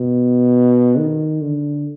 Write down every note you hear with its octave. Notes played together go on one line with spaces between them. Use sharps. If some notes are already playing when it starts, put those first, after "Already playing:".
Already playing: B2
D#3
D3